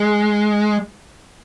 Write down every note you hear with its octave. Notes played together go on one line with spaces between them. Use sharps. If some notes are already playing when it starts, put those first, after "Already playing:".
Already playing: G#3